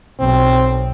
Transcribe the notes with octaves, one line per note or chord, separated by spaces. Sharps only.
B1 C4